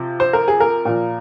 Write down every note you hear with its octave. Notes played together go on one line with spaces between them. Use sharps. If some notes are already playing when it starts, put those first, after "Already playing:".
Already playing: C3 F3
C5
A#4
G#4
A#4
A#2 F3